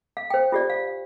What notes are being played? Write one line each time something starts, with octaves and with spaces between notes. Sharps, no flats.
F5
C5 G5
F4 G4 D5
F5